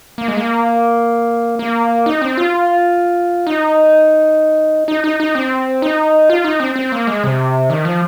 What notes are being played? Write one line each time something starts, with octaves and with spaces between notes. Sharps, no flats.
A#3
G#3
A#3
A#3
D#4
C4
F4
D#4
D#4
D#4
D#4
C4
D#4
F4
D#4
C4
C4
A#3
G#3
C3
D#3
F3